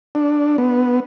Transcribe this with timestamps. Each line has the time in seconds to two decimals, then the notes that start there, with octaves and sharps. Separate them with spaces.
0.15 D4
0.58 B3